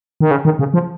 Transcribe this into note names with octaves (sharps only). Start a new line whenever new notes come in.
D#3
C#3
D#3
C#3
F3